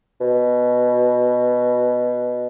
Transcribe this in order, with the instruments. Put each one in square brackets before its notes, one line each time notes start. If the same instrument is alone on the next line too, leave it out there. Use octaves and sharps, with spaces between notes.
[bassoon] B2